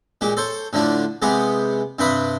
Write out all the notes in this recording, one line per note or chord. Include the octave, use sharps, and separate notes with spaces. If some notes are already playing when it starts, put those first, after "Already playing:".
A#2 G#3 G4
A4 C5 C#5
A2 D3 F3 D4
C3 G#3 B3 G4 G#4
G2 C3 C4 B4 B5 D#6